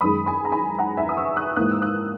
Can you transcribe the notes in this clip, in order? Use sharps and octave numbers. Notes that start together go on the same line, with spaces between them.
F#2 D#3 G#3 B5 D#6
G#5 B5
A#5
G#5 B5
F#5 A#5
E5 G#5
D#6
C#6 E6
D#6 F#6
G#2 E3 A#3 D#6 F#6
E6
D#6 F#6